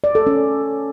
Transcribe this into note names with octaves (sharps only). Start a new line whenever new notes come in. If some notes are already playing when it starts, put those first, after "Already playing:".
D5
A4
C#4